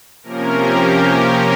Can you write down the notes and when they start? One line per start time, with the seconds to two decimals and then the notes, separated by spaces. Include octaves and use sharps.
0.23 C3 F3 A#3 C#4 A#4
0.54 G4